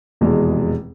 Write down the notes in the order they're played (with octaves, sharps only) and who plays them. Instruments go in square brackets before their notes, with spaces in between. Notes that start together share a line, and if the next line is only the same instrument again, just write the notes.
[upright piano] F1 E2 B2 G#3